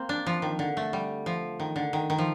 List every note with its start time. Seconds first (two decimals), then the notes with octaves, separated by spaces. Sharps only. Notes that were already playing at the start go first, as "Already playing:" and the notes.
Already playing: A#3 C4
0.09 D4
0.26 F3
0.42 D#3
0.59 D3
0.77 A3
0.93 G3
1.26 F3
1.60 D#3
1.76 D3
1.93 D#3
2.10 D#3
2.18 F3